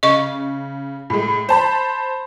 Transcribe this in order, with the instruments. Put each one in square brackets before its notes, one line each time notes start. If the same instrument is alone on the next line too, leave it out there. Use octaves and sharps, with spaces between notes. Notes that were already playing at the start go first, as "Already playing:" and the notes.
[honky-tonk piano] C#3 [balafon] D#5 C#6
[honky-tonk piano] A2 G#3
C5 A5 B5